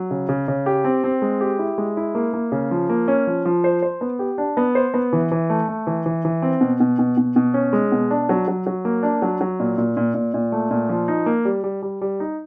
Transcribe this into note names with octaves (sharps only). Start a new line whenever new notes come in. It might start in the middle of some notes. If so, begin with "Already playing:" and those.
Already playing: F#3
C#3
C#3
C#3
G4
C4
C4
G#3
G4
E4
G#3
E4
A#3
A#3
C#3
F3
A#3
C#4
F3
F3
C5
C5
B3
G4
D4
B3
C5
B3
E3
E3
A3
A3
E3
E3
E3
C4
B2
B2
B2
B2
B2
C#4
G#3
B2
D4
F#3
F#3
F#3
A#3
D4
F#3
F#3
A#2
A#2
A#2
A#2
A#2
A3
A#2
F3
D#4
A#3
G3
G3
G3
G3
D#4